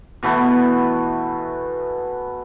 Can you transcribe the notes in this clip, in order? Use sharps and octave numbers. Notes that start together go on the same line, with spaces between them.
B2 E3 A3 B3